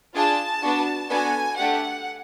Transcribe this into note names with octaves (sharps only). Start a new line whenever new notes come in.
D4 F4 G#4 A5
B3 D4 F#4
B3 D4 F#4 A4 G#5
A3 D4 G4 F#5